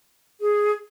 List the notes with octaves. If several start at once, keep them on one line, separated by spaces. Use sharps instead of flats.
G#4